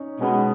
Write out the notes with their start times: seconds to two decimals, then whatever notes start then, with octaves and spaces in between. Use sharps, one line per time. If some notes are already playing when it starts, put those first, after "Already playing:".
Already playing: C#4 D#4
0.20 B2 G#3 B3 C#4 D#4